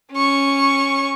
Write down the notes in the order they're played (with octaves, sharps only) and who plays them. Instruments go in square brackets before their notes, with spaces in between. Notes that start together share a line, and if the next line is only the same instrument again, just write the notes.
[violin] C#4 C#6